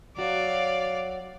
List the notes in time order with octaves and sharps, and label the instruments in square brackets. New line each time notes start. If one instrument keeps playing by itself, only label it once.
[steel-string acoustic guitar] F#3 F#4 C#5 [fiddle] D5 F5